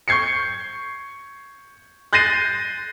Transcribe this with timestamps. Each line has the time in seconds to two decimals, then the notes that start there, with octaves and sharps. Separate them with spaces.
0.08 C#6 G6 G#6 C7 C#7
2.13 F#6 G6 A6 A#6 C7 D#7